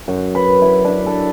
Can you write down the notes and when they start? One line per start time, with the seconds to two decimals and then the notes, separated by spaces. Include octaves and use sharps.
0.08 F#2
0.35 B4
0.62 E4
0.85 D4
1.06 A4